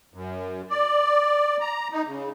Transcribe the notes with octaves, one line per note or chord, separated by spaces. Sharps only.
F#2
D5
A#5
D#4
C#3